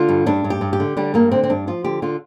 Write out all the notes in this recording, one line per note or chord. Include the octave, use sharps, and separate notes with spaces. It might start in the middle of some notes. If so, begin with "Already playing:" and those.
Already playing: D3 F4
G2
G2 D4
G2
G4
G2
G4
D3
D3 G3
G2 A#3
D3 C4
C4
G2 D4
F3 F4
D3 G4
D3 F4